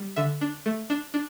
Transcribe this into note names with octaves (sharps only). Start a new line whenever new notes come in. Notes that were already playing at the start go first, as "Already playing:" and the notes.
Already playing: G3
D3 E5
D4
A3
D4
D4